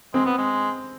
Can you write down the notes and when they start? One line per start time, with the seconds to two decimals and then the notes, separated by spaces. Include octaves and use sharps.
0.14 G#3 C4
0.26 B3
0.38 G#3